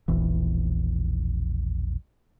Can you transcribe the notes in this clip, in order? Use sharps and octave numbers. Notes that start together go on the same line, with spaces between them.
E1 A#1 E3